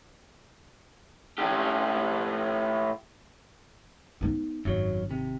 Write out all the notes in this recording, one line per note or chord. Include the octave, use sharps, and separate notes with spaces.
A2 G4
B3 D#4
G#1 F#2 F#3
C3